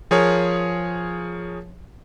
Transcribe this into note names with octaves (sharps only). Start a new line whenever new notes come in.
F3 G#4 A#4 C#5